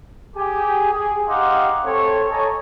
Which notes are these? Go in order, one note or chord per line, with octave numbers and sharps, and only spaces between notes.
G4 G#4 G#5
G#4
D#4 G4 F5 F#5 C6 D6
C4 A4 C#5
A4 C#5 D#5 G#5 A#5 C#6